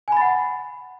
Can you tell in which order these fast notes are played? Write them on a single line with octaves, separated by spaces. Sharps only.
G#5 B5 A6 F#5